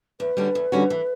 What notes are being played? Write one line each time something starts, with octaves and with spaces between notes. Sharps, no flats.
E2 B4
D3 G3 C#4 F#4
E2
D3 G3 C#4 F#4
E3